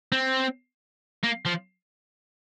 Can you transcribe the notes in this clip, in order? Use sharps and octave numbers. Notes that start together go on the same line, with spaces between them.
C4
A#3
F3